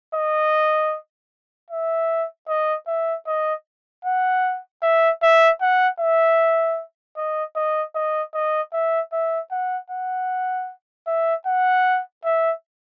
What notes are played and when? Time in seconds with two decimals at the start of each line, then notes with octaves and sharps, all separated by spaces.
0.15 D#5
1.71 E5
2.48 D#5
2.87 E5
3.27 D#5
4.05 F#5
4.83 E5
5.22 E5
5.61 F#5
6.00 E5
7.17 D#5
7.56 D#5
7.95 D#5
8.34 D#5
8.73 E5
9.12 E5
9.51 F#5
9.90 F#5
11.07 E5
11.46 F#5
12.24 E5